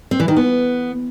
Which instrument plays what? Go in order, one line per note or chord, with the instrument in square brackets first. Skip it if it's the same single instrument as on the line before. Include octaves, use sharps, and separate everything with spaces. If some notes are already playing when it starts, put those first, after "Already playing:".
[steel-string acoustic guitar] C4
E3
D#3
B3